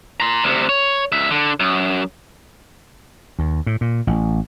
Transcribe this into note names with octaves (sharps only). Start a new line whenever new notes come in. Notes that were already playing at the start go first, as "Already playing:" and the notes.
A#5 C6
D2 C3
C#5
C#2 E5
D3
F#2
D#2
A2
A#2
A1